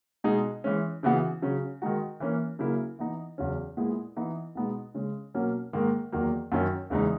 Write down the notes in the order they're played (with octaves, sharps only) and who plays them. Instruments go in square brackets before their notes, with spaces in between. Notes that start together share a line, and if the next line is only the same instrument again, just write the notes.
[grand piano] B2 G#3 D#4 G#4
E3 G#3 C#4
C#3 E3 B3 F#4
C#3 F#3 C#4
D#3 G#3 D#4 F#4
E3 A#3 C#4
C#3 F#3 A#3 E4
E3 B3 D#4
E2 C#3 F#3 C#4
A#2 G#3 B3 E4 G#4
E3 B3 D#4
B2 G#3 B3 D#4
C#3 G#3 C#4
B2 F#3 A#3 C#4
G#2 D#3 A#3
E2 D#3 F#3 A#3
F#2 D#3 F#3 C#4
E2 C#3 E3 G#3 D#4